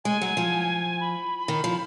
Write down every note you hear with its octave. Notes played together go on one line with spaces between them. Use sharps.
G#3 G#5
F#3
F3
B5
D#3
F3